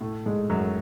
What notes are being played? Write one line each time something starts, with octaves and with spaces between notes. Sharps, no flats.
A2 A3
G#2 G#3
F#2 F#3